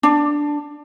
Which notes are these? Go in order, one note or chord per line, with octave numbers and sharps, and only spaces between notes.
D4